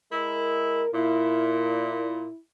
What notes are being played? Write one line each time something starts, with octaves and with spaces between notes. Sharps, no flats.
G#3 E4 A#4
A#2 E4